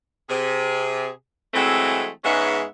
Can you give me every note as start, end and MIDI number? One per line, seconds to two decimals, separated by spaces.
0.30 1.09 48
0.30 1.09 68
1.54 2.07 52
1.54 2.07 54
1.54 2.07 56
1.54 2.07 57
1.54 2.07 60
2.25 2.64 44
2.25 2.64 56
2.25 2.64 59
2.25 2.64 61
2.25 2.64 76
2.25 2.64 78